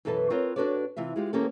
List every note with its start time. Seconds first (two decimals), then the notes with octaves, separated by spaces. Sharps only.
0.05 F#2 B2 E3 A4 B4 A5
0.30 C4 F4 A#4 B4 C#5
0.56 D4 F#4 A4 B4 C#5 D5
0.97 C3 E3 F4 E5
1.16 G#3 F4 G4
1.33 D#3 A#3 B3 C#4 G4 A4